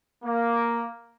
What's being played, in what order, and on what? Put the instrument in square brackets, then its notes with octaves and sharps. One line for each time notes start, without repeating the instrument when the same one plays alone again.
[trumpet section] A#3